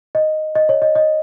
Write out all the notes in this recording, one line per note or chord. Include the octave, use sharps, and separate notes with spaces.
D#5
D#5
C#5
D#5
D#5